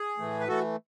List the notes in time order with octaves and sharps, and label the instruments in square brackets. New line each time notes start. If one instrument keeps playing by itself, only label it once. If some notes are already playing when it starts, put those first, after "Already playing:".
Already playing: [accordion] G#4
A2 E3 A3
B4
E3 A3 F#4 A4